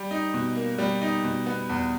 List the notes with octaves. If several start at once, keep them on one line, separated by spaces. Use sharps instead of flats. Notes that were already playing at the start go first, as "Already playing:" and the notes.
Already playing: G3
D#4
B2
A#3
G3
D#4
B2
B3
E2